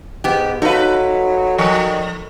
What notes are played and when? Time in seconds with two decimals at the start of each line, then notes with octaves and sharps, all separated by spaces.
0.24 G#2 B3 G4
0.62 F#3 D#4 F#4 A4 B4 F5
1.58 D#3 F3